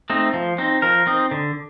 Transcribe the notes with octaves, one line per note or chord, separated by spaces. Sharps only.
A3 C4 D#4
F3
C4 D#4
F3 A#4
C4 D#4
D3